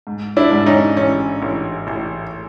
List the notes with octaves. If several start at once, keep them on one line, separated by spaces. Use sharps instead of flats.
G#2
D4 E4
G#2
C#4 D#4
A1 C#4
A1
A1